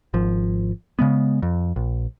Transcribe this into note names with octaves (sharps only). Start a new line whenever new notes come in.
G#1 F3
C#3 G#3 B3
F2
A#1